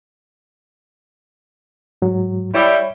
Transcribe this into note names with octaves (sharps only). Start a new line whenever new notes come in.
G#2 F#3
G3 E4 C#5